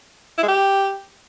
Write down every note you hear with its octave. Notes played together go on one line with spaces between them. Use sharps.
E4
G#3
G4